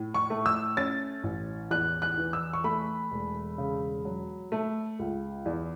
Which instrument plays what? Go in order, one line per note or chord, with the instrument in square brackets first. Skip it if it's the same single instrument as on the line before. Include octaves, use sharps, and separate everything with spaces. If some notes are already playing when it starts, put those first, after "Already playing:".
Already playing: [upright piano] A2
C#6
A3
E6
C#4 A6
A1
E2 F#6
F#6
E3
E6
C#6
A3 B5
E1
C#3
F#3
A3
C#2
E2